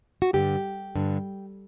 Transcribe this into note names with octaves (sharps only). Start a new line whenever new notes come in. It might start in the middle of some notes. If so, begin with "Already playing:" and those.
F#4
G2 D3 G4
G2 D3